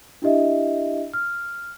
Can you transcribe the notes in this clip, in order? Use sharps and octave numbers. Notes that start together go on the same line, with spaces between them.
D4 E4 G4 D#5 E5
F6